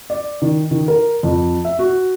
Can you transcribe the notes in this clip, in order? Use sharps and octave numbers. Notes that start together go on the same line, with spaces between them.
D5
D#3
D#3
A#4
F2
E5
F#4